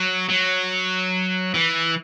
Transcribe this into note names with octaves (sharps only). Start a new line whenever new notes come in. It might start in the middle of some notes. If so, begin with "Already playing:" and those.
Already playing: F#3
F#3
E3